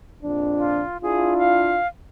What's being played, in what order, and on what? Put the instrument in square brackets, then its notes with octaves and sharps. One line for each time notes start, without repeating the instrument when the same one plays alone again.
[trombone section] A#1 F2 D4
[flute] F4
[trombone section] D4 E4 F4 [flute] G#4
[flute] F5